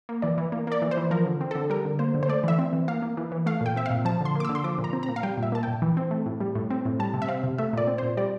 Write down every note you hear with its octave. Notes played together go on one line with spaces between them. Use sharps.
A#3
E3 D5
E3
A#3
A#3 D5
E3
C5
E3
F3 A#4
D3
C4
D3 A4
G3 A#4
D3
A#3 C5
D3
C5
A3 D5
E3 E5
C4
E3
A#3 F5
A#3
E3
E3
A3 F5
A#2 G5
C4 E5
A#2 F5
F3 A5
D3 C6
A#3 D6
D3 E6
C6
F3 D6
A#2
A#5
C4
A#5
A#2
F5
G3 G5
A#2
E5
A#3 A5
A#2 G5
E3
C4
A3
A2
G3
A2
C4
A2
G3 A5
C3
E5
C4 F5
C3
A3 E5
A#2 D5
C4
A#2 C5
G3 D5